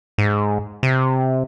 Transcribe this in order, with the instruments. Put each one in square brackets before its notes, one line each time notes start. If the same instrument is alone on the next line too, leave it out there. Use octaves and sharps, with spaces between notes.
[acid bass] G#2
C3